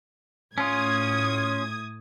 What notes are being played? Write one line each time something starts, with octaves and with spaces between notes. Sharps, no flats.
A2 C#4 F4 D#6 G#6